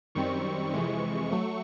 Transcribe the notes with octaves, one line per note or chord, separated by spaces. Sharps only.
F#2 D#3 G3 C4 C#6
F2 C3 E3 G#3
F#3 A3